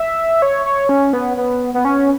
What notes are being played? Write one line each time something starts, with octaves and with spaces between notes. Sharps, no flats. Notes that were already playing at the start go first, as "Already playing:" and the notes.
Already playing: E5
C#5
C#5
C#4
B3
B3
B3
C#4